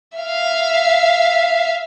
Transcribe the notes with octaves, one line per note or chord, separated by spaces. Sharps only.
E5 F5